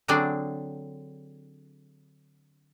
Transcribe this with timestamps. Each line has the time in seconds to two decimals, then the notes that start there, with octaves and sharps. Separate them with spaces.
0.08 D3 F#3 C4 D4 G#4 D5